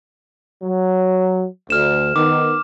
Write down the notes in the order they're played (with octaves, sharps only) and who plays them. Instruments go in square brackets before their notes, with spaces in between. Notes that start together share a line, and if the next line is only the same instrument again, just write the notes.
[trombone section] F#3
[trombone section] D2 [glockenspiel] F6 E7
[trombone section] D#3 B3 [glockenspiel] D6